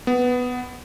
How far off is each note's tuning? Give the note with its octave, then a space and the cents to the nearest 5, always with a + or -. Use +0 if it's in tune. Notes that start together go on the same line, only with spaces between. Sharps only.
B3 +5